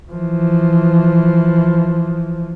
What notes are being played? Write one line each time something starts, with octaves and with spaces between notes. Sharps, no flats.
E3 F3